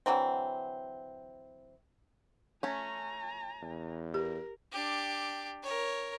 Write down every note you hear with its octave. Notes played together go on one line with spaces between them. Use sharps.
D3 E3 F#3 C4
A3 C#4 G#5 A#5
E2
G4 A#4
D4 G4
A#4 C#5